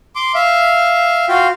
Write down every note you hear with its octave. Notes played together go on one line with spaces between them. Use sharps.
C6 D6
E5 F5
F4 F#4 F5 G5